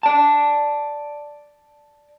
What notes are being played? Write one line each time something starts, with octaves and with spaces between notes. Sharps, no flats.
D5 A5